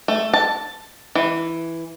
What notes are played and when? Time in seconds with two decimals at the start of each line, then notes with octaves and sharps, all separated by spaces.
0.08 A3
0.33 A5
1.15 E3